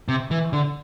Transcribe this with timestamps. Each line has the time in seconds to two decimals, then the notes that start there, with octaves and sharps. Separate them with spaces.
0.08 C3
0.31 E3
0.53 D3